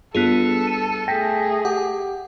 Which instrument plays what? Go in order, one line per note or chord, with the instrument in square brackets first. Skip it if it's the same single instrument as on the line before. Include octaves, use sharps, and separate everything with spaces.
[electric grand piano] G2 [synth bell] B3 F4 G#4 [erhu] A4
[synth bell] D#7
[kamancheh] A3 G#4 [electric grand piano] G5 [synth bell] A#6 B6
[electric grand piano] G4 [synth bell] F#5